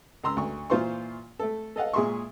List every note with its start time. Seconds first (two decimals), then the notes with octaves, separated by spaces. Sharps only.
0.24 C#2 A#5 C6 E6
0.37 D2 C#6
0.70 A#2 E3 F4 C5 C6 C#6
1.39 A3 A4
1.76 A4 D#5 F5 F#5
1.93 A#2 G#3 G#4 E5 C6 C#6